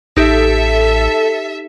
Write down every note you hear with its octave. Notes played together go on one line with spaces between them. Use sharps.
A1 D#4 G4 A4 E5